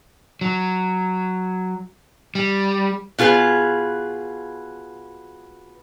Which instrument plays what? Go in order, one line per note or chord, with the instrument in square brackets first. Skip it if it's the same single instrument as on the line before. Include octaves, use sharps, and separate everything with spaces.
[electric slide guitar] F#3
G3
[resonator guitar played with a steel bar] B2 F4 G#4 B4